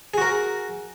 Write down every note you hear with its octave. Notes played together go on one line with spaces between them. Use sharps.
F#4 G#4 A#4